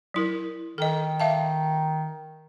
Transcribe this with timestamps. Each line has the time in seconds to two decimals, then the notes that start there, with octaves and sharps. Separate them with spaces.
0.14 F#3 E4 A#4
0.78 D#3 A4 D#5
1.20 E5 F5 A5